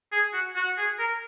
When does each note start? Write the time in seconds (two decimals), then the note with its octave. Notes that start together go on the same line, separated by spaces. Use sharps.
0.12 G#4
0.33 F#4
0.56 F#4
0.78 G#4
0.99 A#4